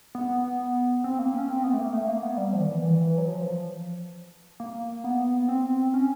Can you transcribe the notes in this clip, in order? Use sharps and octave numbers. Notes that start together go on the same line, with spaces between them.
B3
C4
A#3
C#4
C4
B3
A3
A#3
A3
A#3
B3
G3
F3
D#3
E3
E3
F#3
F3
F3
A#3
B3
C4
C#4